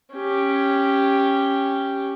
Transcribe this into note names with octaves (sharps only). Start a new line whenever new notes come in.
C#4 G4